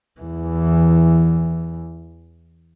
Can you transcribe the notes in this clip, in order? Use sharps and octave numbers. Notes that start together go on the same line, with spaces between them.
E2 E3